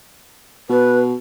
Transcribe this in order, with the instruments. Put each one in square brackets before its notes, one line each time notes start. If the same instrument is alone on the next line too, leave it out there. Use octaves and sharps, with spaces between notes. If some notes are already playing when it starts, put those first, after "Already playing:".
[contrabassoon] B2 [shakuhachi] B4